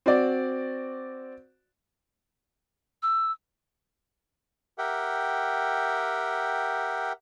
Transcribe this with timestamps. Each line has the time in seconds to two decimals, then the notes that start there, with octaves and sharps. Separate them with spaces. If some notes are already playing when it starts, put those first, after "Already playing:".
0.06 C4 F#4 D5
3.03 E6
4.78 G4 A#4 E5 F#5 G5